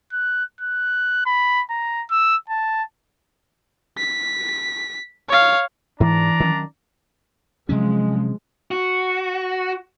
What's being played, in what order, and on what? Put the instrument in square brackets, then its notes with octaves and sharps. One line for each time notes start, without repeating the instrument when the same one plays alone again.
[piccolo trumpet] F#6
F#6
B5
A#5
E6
A5
[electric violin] B6
C#5 F5
[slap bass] G#2 [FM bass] E3 [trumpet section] D4 D5 A#5
[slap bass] D#3 F#3 C#4
[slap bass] C3 F#3 C#4 [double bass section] F3 G#3
[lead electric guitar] F#4